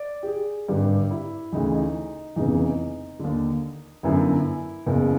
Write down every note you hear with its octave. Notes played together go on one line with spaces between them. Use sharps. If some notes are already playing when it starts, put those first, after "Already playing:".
Already playing: D5
G4
G#4
G#1 G2 D3 G4
E4
D2 C#3 E3 D#4
D#4
F1 E2 C#3 E3 D#4
D#2 D3
G1 F#2 D3 E4
F#1 E2 C#3